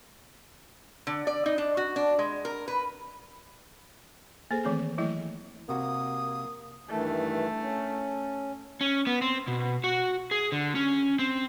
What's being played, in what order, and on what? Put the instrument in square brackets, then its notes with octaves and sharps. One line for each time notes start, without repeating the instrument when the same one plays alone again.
[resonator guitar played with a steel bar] D3
D5
D#4
D4
F#4
D4
G#3
A#4
B4
[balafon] A#3 G#4 A4 C5
D#3 E3 A3 C4 G#4
E3 F#3 A3 E4
[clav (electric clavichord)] C3 F#4 [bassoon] A#3 [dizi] D#6
[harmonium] G2 D#3 E3 [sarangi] A3
[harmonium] C#4
[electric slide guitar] C#4
B3
C4
B2
F#4
G#4
D3
C#4
C4